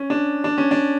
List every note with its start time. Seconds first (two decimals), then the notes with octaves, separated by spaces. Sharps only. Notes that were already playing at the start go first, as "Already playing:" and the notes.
Already playing: C#4
0.10 D4
0.44 D4
0.58 C#4
0.71 D4